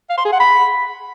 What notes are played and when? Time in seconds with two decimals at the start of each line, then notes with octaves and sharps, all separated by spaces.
0.10 F5
0.18 C6
0.25 G#4
0.33 F#5
0.40 B5